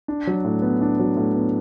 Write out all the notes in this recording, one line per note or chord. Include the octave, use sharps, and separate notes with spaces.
D4
F#3
A2
B3
D4
F#3
A2
B3